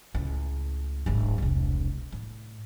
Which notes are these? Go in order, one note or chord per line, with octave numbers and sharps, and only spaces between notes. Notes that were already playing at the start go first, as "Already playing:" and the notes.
C#2 A2
D1 G#1
E1 C2
A2